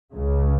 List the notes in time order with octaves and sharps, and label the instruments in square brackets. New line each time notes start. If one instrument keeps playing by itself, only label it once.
[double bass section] C#2 C#3